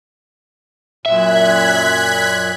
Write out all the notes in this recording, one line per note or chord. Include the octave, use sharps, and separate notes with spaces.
F#2 A#2 E5 F#6 G#6 B6